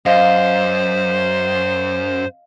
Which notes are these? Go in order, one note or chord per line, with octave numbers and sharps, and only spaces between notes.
F#2 C5 D#5 F5